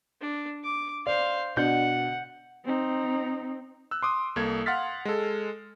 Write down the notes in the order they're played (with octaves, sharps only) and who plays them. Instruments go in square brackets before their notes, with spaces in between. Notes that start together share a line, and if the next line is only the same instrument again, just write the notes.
[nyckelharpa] D4
D6
[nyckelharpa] C5 F5 [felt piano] D5
[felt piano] B2 D4 G6 [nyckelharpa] F#5
[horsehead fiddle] C4 D#4
[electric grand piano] E6 F#6
C6 D6 D#6
C2 A#3 A4 G#6
F5 F#5 C6 F6 A6 B6
G#3 A4